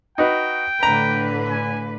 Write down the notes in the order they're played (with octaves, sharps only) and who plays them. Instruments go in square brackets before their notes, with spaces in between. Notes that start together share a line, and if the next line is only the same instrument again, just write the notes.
[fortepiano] D#4 F#4 B4 [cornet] G5
[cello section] A2 D3 B4 [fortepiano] A#5
[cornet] G#5